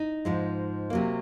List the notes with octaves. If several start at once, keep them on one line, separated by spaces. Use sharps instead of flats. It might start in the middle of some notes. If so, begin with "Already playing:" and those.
Already playing: D#4
G#2 F3 G#3
C3 F#3 A#3